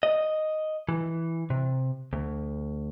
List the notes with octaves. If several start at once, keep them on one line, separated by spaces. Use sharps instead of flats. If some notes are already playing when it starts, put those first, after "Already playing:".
D#5
E3
C3
D2